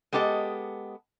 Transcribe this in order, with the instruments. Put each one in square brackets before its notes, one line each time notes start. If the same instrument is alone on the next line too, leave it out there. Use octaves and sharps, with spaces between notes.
[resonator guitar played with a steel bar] G#3 B3 G4 A4 D#5